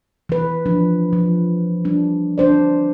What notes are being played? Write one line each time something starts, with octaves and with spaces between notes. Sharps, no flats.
E3 B4
F3 D4
F3
G3 D4
D4 C5 D5